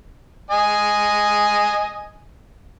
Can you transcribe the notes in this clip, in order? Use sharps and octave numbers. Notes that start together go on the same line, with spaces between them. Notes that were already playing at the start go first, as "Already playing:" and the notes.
D#5 G#5